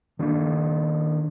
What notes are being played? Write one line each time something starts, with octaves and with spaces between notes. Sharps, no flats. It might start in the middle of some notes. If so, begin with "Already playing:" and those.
D#3 A#3 C4 D4